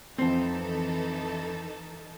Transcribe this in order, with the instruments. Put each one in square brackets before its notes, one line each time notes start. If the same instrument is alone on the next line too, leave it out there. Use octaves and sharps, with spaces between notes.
[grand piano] F2 C7 [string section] E3 D#4 A4 [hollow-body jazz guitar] C4